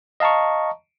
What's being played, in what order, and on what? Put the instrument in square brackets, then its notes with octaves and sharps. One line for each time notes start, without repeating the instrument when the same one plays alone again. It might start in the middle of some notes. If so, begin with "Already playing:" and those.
[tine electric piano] D#5 F5 A5 A#5 C#6